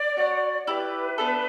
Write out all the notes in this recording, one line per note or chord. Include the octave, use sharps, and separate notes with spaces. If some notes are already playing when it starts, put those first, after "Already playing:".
Already playing: D5
F#4 C#5 F#5
E4 G4 B4 D5
B3 D4 A4